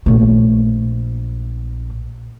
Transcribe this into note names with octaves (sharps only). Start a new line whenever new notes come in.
A#1 A3